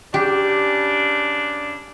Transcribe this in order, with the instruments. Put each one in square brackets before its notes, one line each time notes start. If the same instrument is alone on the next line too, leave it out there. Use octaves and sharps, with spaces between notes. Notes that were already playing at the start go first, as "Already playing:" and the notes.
[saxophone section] C#3 D4 [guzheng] G4